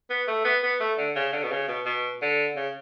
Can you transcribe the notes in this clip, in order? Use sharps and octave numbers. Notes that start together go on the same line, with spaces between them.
B3
A3
B3
B3
A3
D3
C#3
D3
B2
C#3
B2
B2
D3
C#3